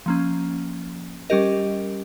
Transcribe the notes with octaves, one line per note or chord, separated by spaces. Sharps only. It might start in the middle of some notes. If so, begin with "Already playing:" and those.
F3 A#3 C#4
G3 C#4 G4 A#4 D#5